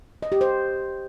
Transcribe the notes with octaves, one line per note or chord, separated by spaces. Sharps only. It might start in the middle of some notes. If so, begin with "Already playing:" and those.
D#5
G4
C5